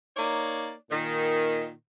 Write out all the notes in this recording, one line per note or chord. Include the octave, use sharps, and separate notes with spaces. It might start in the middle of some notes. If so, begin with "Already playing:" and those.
A#3 D#4 C#5 D5
A#2 D#3